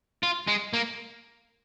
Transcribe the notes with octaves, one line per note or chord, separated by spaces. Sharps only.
F4
G#3
A#3